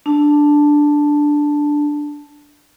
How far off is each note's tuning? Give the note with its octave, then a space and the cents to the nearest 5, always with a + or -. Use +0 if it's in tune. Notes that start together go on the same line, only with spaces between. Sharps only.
D4 +0 A5 +0